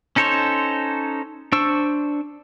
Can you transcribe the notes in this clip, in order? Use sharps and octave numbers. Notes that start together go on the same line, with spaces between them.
C#4 D#4 A4 C5 C#5
D4 C5 C#6 E6